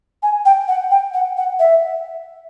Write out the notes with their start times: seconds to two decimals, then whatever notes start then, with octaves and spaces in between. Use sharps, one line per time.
0.23 G#5
0.45 G5
0.68 F#5
0.91 G5
1.14 F#5
1.37 F#5
1.59 E5